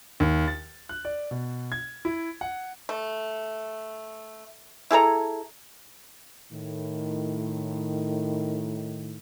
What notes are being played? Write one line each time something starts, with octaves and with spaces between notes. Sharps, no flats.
D#2
A6
F#6
D5
B2
G#6
E4
F#5
A3
E4 G#4 A4 A#5
A2 D#3